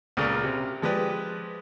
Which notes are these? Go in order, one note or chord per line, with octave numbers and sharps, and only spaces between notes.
C#2 A#2 C#3 G#4 A#4 D5
C3
F3 G#3 G4 B4 D5